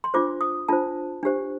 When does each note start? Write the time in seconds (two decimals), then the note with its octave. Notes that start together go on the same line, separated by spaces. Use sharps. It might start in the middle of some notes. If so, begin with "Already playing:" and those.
0.04 C6
0.14 D4 F4 C5 D6
0.41 D#6
0.69 D4 F4 C5 A5
1.23 D4 G4 C5